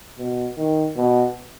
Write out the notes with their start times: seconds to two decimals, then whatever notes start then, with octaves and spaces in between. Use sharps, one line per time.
0.18 B2
0.57 D#3
0.96 B2